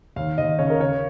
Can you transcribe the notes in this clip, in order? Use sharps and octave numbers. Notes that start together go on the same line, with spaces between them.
D#2 F5
D#2 D#5
C#3 C#5
A#4
C#3 C#5